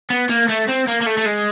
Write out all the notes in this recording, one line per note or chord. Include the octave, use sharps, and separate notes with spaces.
B3
A#3
A3
C4
A#3
A#3
A3
A3
G#3